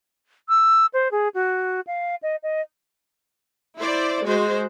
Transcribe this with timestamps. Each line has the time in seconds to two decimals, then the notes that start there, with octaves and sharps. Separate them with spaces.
0.49 E6
0.93 C5
1.11 G#4
1.34 F#4
1.87 F5
2.23 D#5
2.43 D#5
3.77 E4 C5 D5
4.23 G#3 F#4 C5